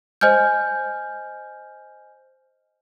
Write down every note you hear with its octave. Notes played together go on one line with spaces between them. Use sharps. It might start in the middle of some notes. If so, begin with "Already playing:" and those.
C5 D#5 G#5 F6 G6